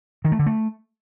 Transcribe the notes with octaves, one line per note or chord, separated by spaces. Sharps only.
D#3
A3
D3
A3